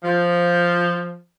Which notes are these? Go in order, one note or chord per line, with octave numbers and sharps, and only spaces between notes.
F3